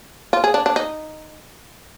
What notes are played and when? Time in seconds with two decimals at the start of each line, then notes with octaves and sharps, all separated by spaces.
0.33 F4
0.44 G#4
0.54 D4
0.66 D4
0.76 D#4